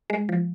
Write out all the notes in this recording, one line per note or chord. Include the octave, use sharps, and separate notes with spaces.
G#3
F3